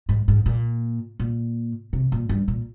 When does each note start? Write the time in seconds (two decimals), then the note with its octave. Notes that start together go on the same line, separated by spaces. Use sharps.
0.09 G#2
0.28 G#2
0.46 A#2
1.20 A#2
1.93 C3
2.12 A#2
2.29 G2
2.48 A#2